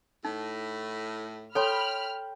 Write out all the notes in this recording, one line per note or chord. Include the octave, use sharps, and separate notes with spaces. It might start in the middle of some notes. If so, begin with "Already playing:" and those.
A2 D#4
A4 C#5 G5 B5 C6 F6